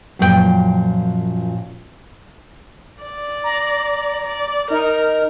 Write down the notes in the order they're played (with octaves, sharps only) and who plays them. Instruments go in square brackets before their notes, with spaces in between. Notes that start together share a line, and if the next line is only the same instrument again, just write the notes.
[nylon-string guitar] F#2 A#2 F3 G4 G5
[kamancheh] D5
[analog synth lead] A#5
[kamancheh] D5
[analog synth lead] D#4 [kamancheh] A#4